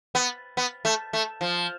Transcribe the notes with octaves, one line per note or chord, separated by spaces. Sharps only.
B3
B3
A3
A3
F3